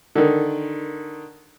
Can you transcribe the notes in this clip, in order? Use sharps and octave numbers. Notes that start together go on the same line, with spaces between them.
D3 D#3